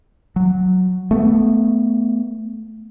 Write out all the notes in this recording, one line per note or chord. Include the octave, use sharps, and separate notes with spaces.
F#3
A3 B3